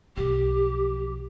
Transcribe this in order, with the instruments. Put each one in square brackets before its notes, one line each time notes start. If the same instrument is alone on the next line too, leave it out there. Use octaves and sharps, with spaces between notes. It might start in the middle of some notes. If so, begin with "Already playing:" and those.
[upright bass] B1 F3 [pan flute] G4